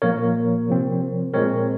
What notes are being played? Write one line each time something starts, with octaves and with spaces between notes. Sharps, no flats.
A#2 F3 A#3 A#4 C#5
C3 F3 C4
A#2 G#3 C4 A#4 C#5